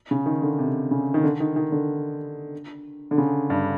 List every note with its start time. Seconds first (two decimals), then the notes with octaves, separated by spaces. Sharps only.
0.11 C#3
0.26 D#3
0.42 D3
0.59 C3
0.91 C#3
1.14 D#3
1.24 D3
1.40 D#3
1.56 D#3
1.72 D3
3.11 D3
3.18 C#3
3.50 G2